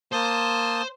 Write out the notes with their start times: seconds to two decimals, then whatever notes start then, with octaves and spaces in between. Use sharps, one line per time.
0.13 A#3 C5 A5 D#6